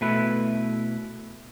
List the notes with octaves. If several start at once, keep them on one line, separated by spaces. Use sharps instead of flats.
B2 A3 E4 B4 E5